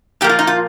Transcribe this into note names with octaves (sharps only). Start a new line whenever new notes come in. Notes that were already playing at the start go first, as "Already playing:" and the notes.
A#2 F3 A#3 G4
F4
D#4
F4